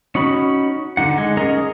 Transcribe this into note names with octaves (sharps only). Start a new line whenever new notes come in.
C#4 D#4 F#4 B5
D3 D#4 F#5
G#3
C#4 G#4 A#4 D#5 A#5